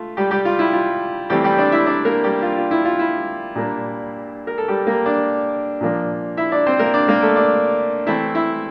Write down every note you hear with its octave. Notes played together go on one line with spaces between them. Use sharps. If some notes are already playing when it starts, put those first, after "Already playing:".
Already playing: A3 F4
G3 G4
G3 G4
F4
E4
F4
E3 G3 A3 C4 G4
G3 G4
D4 D5
E4 E5
D4 D5
A#3 A#4
G3 G4
F4
F4
E4
F4
E4
A#2 G3 A#3 D4
A#4
A4
G3 G4
A#3 A#4
D4 D5
A#2 F3 A#3 D4
E4 E5
D4 D5
C4 C5
A#3 A#4
D4 D5
A#3 A#4
A3 A4
D4 D5
E3 A3 C4 E4 E5
E4 E5